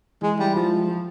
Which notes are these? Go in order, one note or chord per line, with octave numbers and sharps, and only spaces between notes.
E3 G#3
G3 E4
F3 G#3